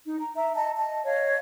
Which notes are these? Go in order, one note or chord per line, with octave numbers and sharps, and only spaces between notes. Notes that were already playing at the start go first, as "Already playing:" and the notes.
D#4
A#5
E5 A#5
D#5 A5 A#5
D#5 A5
C#5 D#5 F5